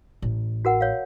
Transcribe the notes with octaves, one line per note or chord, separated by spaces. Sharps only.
A1
F#4 A#4 F#5
C#5 F5